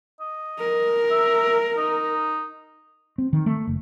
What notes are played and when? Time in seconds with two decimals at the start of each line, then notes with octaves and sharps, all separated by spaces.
0.20 D#5
0.60 A#4
1.11 E5
1.77 D#4
3.18 C4
3.33 D#3
3.46 A3
3.67 F#1